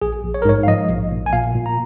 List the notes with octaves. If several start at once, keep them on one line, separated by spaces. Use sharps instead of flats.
A#1 G#4
A#1
C#5
A#4
G#2 C#5
F5
F3 D#5
A#1
A#1
G#5
A#2 F5
A#2
A#5